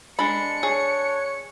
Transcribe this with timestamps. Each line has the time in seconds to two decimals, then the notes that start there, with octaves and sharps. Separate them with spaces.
0.19 G#3 D4 B5 C#7
0.63 G#4 C#5